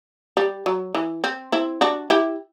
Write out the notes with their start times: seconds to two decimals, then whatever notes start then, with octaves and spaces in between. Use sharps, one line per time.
0.37 G3
0.66 F#3
0.95 E3
1.24 C4
1.52 C4 E4
1.81 D4 F#4
2.10 E4 G4